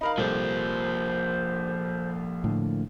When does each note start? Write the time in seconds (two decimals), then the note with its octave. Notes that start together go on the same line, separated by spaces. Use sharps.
0.01 D#4 A#4 F5 B5
0.18 C2 F3 G3 A#3 A4 C5
2.44 A2 D3